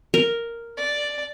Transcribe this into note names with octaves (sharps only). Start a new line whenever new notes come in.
A#4
D5